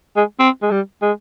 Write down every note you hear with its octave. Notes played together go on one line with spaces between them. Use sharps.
G#3
C4
G#3
G3
G#3